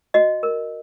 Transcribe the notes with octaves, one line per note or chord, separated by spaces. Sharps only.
F#4 D#5
A#4